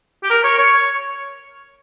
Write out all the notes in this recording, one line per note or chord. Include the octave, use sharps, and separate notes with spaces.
G4
A#4
C#5
C#5